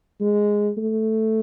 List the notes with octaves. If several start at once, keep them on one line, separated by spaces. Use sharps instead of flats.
G#3
A3